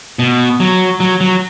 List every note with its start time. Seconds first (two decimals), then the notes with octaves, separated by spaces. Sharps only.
0.19 B2
0.60 F#3
1.00 F#3
1.21 F#3